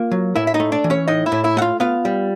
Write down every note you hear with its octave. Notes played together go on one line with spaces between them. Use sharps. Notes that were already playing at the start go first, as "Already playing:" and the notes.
Already playing: A#3 F4 F5
F#3
A2 E4 E5
E5
D#4 D#5
A3
D4 D5
E3
C#4 C#5
A2 D#4 D#5
E4 E5
A2
E4 E5
A3 F4 F5 F#5
B3 F4 F5
G3